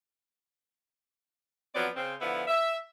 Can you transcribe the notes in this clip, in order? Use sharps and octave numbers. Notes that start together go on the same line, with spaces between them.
F3 F#3 B3 C4 D5
C#3 C4
D3 F3 B3 E4
E5